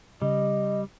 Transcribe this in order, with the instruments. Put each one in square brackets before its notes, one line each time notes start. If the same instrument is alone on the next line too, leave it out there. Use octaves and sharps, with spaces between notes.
[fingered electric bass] C#3 [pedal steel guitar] G3 [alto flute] D#5